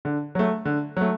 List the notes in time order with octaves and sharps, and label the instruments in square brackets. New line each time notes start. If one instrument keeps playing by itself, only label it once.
[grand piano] D3
F#3 A3
D3
F#3 A3